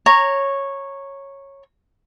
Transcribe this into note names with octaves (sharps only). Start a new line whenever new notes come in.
C#5 A#5